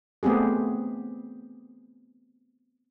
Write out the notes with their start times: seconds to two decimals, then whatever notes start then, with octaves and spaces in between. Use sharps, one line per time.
0.23 A3 B3 C4 G4 G#4